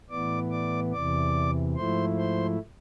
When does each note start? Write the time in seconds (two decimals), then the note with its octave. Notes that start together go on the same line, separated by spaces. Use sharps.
0.10 A2 E3 B3 D5 D6
0.51 D5 D6
0.93 E2 C3 E3 D5 D6
1.75 G#2 F3 A3 E4 C5 C6
2.16 C5 C6